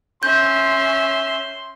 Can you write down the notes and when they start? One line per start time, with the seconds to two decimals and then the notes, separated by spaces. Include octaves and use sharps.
0.23 C#4 E5 C6 G6